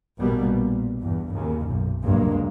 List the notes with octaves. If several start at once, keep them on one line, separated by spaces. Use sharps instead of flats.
A#1 B2 G3 A#3 B3
A#2
E2 G2
D#2 C#3
B1 F#2
F1 C#2 G2 F#3 G#3 A#3